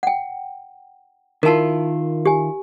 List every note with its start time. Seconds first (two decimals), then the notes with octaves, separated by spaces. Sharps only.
0.03 F#5 G5
1.43 D#3 E4 F4 A#4 A5
2.26 G4 G#5